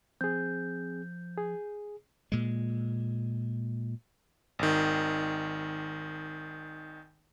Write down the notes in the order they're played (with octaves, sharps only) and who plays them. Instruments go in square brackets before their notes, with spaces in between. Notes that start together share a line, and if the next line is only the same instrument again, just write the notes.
[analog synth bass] F3 [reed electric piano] C4 G#4 [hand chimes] G6
[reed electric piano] G#4
[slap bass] A#2 G#3
[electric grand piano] G#1 D#3